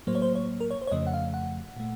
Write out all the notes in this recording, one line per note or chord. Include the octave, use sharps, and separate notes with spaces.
A2 F#3 A#3 C5
C#5
C5
C#5
A#4
C#5
C5
C#5
F2 C#3 F3 A3 D#5
F#5
F5
F#5
A#2 A3